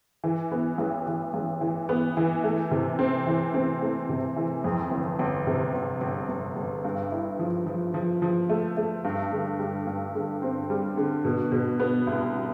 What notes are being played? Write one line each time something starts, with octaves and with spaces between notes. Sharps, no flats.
E3
B3
A1
E3
A1
E3
B3
E3
A3
C3
C4
E3
C4
A3
C3
E3
F2
G1
G1
C3
G1
G1
G1
G1
G2
E4
F3
F3
F3
F3
A3
A3
G2
D3
G3
G2
D3
C4
G3
D3
B2
B2
B3
C2